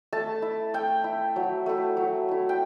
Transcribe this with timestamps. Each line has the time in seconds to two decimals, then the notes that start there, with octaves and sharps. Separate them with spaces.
0.13 A3 A5
0.42 E4
0.74 A3 G5
1.04 E4
1.36 F#3
1.66 A3 E4
1.97 F#3
2.29 A3 E4
2.49 G5